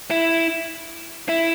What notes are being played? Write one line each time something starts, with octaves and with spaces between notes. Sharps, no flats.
E4
E4